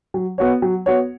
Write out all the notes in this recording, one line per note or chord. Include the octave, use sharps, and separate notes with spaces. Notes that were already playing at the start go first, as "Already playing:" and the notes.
F#3
B3 F#4 C#5
F#3
B3 F#4 C#5